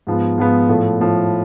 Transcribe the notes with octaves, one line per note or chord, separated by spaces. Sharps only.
G#2 F3 B3
G#2 F3 B3
A2 F3 A3
A2 F3 A3